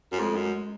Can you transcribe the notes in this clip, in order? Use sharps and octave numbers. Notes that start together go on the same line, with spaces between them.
F#2
F2 G#3
F#2